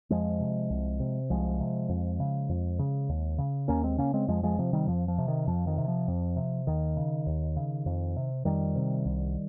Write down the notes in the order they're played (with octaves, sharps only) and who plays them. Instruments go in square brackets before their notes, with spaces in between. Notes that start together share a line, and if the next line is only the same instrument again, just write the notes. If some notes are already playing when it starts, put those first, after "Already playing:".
[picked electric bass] F2 F3 G#3
C3
C2
C3
C2 F3 G#3
C3
F2
C#3
F2
C#3
D#2
C#3
D#2 A#3 C#4
G#3 C4
C#3 A#3 C#4
G#3 C4
F2 F3 G#3
F3 G#3
C3 F3
D#3 G3
F2 F3
F3
C3
D#3
F2 F3
D#3
C3
F3
F2
C3
D#2 D#3
C#3
D#2
C#3
F2
C3
F2 D#3 G3
C3
C2